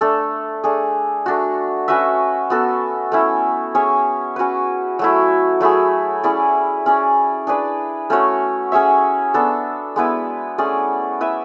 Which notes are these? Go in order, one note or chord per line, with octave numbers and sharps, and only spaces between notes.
A3 D4 A4
A3 D4 G#4
A3 D4 F#4
C#4 F#4 B4 E5
B3 F#4 A4
A3 C#4 E4
C#4 G#4 C#5 E5
C#4 F#4 B4
F#3 A3 E4
F#3 A3 E4 G#4
C#4 E4 G#4 D5
C#4 G#4 D5
D4 G#4 B4 D5
A3 C#4 F#4 C#5
C#4 G#4 C#5 E5
B3 D4 A4
G#3 B3 E4 B4
A3 C#4 G#4 D5
E4 B4 E5